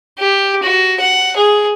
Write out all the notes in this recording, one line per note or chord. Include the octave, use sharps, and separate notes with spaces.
G4
F#4
F#5
G#4